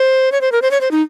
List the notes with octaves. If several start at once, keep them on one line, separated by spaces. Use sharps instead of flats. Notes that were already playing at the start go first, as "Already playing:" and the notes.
Already playing: C5
C#5
C5
A#4
C5
C#5
C5
D#4